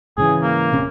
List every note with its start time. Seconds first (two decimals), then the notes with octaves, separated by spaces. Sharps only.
0.18 G#2 C#3 E3 G#4
0.42 A#3
0.72 D#1 C3 C#4